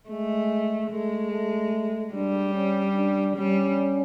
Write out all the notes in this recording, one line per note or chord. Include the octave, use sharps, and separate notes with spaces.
G#3 A3
G#3 A3
A3
G3 D4
C#4
D4
G3 C#4